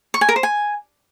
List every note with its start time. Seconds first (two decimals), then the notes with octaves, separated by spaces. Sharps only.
0.14 C#6
0.21 G#5
0.29 A#4
0.36 C5
0.43 G#5